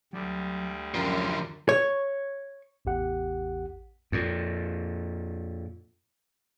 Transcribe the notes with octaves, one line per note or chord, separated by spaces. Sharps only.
D2 F#3 G3
F#2 D3 F3 A#4 D5 G5
C#5
A1 E2 G4 F#5
F2 A#2